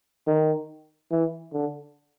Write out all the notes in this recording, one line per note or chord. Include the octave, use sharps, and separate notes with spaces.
D#3
E3
D3